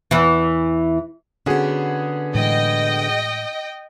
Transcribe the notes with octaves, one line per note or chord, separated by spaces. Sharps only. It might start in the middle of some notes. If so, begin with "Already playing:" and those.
E2 E3
D3 B3 C#4 F#4 G#4
A2 E3 G#3 D#5 G5